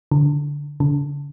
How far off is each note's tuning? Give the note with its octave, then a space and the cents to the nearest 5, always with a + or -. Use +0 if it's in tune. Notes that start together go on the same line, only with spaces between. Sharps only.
D3 -15
D3 -40